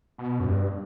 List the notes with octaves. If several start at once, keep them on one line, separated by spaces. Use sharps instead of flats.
B2
F#2
G2